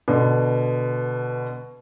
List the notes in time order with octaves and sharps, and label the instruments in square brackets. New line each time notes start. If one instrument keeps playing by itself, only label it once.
[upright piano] B2 D3 [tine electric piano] B4